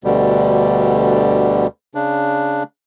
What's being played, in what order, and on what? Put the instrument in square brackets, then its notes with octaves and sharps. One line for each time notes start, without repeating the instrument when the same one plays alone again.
[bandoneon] D2 B2 D3 G3
C#3 D4